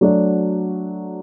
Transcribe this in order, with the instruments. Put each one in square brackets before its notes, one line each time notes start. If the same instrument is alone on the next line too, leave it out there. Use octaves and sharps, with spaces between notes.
[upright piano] F#3 A3 D4 F#4